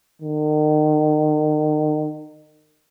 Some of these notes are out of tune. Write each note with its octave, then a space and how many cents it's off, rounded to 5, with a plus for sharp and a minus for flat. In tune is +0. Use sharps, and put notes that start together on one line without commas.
D#3 -35